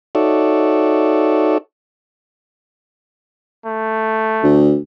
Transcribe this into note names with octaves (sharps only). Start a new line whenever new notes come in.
D#4 F#4 A4 C#5 D5 E5
A3
D2